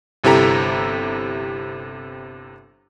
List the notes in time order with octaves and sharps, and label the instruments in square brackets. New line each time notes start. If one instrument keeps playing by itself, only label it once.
[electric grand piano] G1 C3 E4 G4 A4 A#5